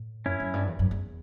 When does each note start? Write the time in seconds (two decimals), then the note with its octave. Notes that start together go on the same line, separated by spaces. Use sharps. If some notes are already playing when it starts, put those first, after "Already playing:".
Already playing: A2
0.25 F#2 C#4 E4
0.40 F#2
0.53 G2
0.67 E2
0.79 F#2
0.91 E2